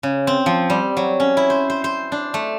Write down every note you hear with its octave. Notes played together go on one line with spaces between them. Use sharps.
C#3
C4
F3
G3
F#3
C#4
E4
C5
C5
C5
D4
A3